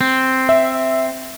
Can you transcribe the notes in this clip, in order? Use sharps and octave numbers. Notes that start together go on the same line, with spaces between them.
C4
E5